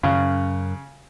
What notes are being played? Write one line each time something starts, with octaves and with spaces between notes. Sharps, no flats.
F#2 C#3